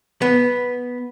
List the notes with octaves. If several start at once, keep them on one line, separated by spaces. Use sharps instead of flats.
B3